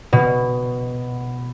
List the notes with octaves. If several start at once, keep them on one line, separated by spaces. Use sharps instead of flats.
B2